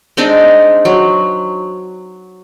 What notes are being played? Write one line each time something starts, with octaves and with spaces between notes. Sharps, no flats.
G#3 C4 D4 D#4
F#3